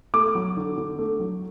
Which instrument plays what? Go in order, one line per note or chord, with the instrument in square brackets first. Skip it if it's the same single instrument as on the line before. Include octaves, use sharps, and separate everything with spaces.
[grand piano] A3 D6
F#3
D3
D3
A3
F#3